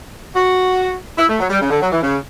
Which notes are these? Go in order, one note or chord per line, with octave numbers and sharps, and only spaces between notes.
F#4
E4
A3
F#3
G3
C#3
D3
F#3
E3
C#3